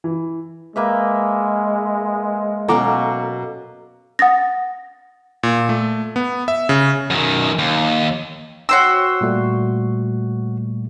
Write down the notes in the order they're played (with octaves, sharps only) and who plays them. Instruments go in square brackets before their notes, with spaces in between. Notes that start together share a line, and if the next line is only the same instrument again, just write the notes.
[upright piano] E3
[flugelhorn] G#3 [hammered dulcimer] A#3 B4 E5
[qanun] B2 F#3 C#4 [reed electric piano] A4 A#5 D6 [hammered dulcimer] F5
[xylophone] F#5 D#6 A6 A#6
[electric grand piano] A#2
A3
B3
E5
C#3
[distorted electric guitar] F#2 D#3
D#2
[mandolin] F#4 C5 E6 [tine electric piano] C#5 G5
[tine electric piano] A#2 G3 A3